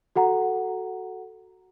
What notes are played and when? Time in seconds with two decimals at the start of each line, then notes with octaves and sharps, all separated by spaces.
0.16 F#4 A4 F#5 A#5